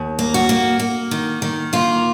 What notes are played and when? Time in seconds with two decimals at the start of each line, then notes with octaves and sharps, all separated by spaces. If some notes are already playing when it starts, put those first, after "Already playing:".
Already playing: D#2
0.19 A#3
0.34 F#4
0.49 A#3
0.80 A#3
1.11 D#3
1.42 D#3
1.73 A#3 F4